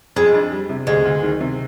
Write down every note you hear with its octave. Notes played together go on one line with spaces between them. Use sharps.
F2 G#3
D4
G3
C3
D2 G#3
D2
D#3
C3